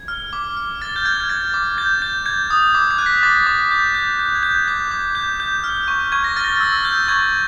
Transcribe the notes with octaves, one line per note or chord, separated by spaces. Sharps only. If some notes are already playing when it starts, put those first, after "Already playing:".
Already playing: G#6
F6
D6
F6
F6 A6
G6
F6 G#6
G#6
F6 A6
D6
G6 A6
G6
G6 G#6
D#6
D6
G#6
F#6
B6
D6 A6
D6
G6
G6
G6
G#6
G6
G#6
D6 G6
D6
G6
G6
F6
C#6
C#6 G#6
A#6
F6 A6
A#6
A6
E6 A#6
G6
C#6 G#6